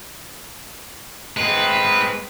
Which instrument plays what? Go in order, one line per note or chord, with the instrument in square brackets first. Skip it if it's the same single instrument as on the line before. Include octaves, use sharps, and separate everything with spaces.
[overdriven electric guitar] G#3 C4 [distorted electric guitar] B4